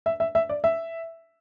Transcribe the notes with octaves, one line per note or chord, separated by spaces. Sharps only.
E5
E5
E5
D5
E5